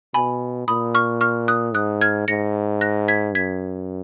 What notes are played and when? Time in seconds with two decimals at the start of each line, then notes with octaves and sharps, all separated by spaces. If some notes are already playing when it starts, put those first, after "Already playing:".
0.14 B2 G#5 B5
0.68 A#2 B5 D#6
0.95 C#6 F6
1.21 C#6 F6
1.48 D#6 F#6
1.75 G#2 D#6 F#6
2.01 F6 G#6
2.28 G#2 A#6 C#7
2.81 F#6 A#6
3.08 G#6 B6
3.35 F#2 G#6 B6